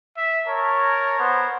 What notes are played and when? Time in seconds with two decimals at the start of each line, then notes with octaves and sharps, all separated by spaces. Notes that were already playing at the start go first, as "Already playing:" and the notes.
0.17 E5
0.47 A#4 C#5 A5
1.19 B3 C5